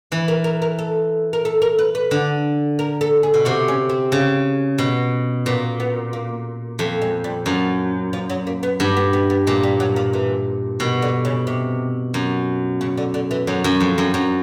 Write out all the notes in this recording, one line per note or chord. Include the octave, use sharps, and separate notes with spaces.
E3 B4
A#4
A#4
A#4
A4
A#4
A4
A#4
B4
B4
D3
A#4
A4
G#4
B2
C3 F#4
C#4
C4
C#3
B2
A#2 B3
B3
A#3
F2 A3
G#3
G3
F#2 F3
F3
F#3
A#3
B3
G2 B3
B3
B3
B3
A#2 G#3
G3
F#3
F3
E3
B2 D#3
D3
C#3
C3
F#2
C#3
D3
D3
E3
F#2 F#3
F#2
F2
F#2
F#2 F#3